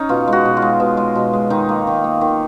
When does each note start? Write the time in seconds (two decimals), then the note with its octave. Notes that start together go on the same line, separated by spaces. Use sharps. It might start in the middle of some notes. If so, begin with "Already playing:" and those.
Already playing: C#4 D#4
0.09 B2 F4
0.27 G#3
0.33 F#4
0.45 B2
0.57 F4
0.62 G#3
0.80 B2
0.97 G#3
1.15 B2
1.33 G#3
1.50 D#3 D#4
1.69 A#3
1.87 D#3
2.04 A#3
2.21 D#3